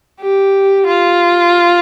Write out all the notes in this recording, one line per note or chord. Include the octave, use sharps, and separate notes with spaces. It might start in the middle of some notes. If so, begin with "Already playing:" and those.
G4
F4